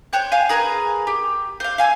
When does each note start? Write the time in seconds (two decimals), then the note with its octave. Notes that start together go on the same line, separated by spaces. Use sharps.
0.13 C5 C#5 G5 F#6
0.32 F5 G#5
0.49 G#4 A#4 B4 G#5
1.07 G4
1.60 C5 F5
1.78 F5 G#5 E6